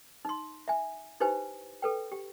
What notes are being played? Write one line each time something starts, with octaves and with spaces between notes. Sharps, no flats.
D#4 C6
E5 G#5
D#4 E4 G4 B4 C5 G#5
A4 B4 G5
G4